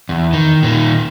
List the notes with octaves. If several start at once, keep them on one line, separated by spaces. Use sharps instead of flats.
E2
D#3
A#2 D#3